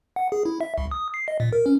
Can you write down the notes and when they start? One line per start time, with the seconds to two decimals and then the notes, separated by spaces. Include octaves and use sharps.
0.16 F#5
0.32 G#4
0.45 E4
0.61 E5
0.78 C2
0.91 D#6
1.14 C7
1.28 D#5
1.40 A#2
1.53 A#4
1.66 C#4